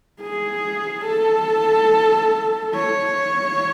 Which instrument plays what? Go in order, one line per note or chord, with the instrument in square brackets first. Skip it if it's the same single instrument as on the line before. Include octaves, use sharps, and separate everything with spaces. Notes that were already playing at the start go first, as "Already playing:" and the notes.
[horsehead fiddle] G#4
A4
C#5